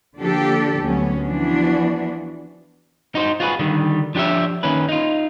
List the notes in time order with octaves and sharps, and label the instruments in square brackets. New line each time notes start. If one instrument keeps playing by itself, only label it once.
[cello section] D3 F3 A#3 D4 G4 A4
D2 F#3 B3 C#4
E3 F3 B3 D4 F#4
[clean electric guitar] D#4 F#4 C5
F4 F#4 G#4 B4
D3 D#3 G3
F3 D4 G4 C#5 E5
D#3 A#3 C#4 B4
D#4 F4